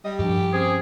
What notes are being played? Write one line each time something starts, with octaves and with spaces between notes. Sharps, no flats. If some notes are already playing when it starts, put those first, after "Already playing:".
G3 D#5
G2 F3 D4 G4
C4 C#4 G#4